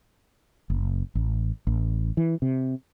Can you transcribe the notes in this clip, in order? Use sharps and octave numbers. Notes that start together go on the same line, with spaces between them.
F#1
A1
A1
E3
C3